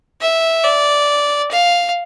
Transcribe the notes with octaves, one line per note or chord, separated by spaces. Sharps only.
E5
D5
F5